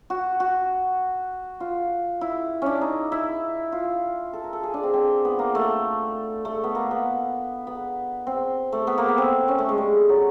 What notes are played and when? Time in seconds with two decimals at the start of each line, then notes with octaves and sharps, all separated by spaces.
0.10 F#4
0.40 F#4
1.60 F4
2.21 E4
2.62 C#4 D4
2.81 D#4
3.12 E4
3.72 F4
4.33 A4
4.44 A#4
4.53 A4
4.63 G#4
4.74 D4
4.83 C4
4.94 C4
5.25 B3
5.39 A#3
5.55 A3
6.45 A3
6.64 B3
6.75 A#3
6.91 B3
7.67 B3
8.27 C4
8.72 A3
8.87 B3
8.98 A#3
9.08 B3
9.18 C4
9.48 C#4
9.58 A3
9.69 G#3
9.78 G3
10.09 F#3